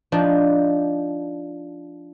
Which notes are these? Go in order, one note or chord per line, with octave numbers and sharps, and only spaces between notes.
F3 D4 D#4